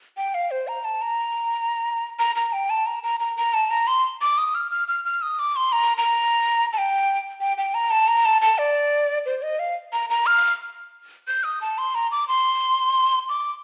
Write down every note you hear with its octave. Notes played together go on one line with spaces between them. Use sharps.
G5
F5
C5
A#5
A5
A#5
A#5
A#5
G5
A5
A#5
A#5
A#5
A#5
A5
A#5
C6
D6
D#6
F6
F6
F6
F6
D#6
D6
C6
A#5
A#5
A5
G5
G5
G5
A#5
A5
A#5
A5
A5
D5
C5
D#5
F5
A#5
A#5
F6
G6
D#6
A5
C6
A#5
D6
C6
D6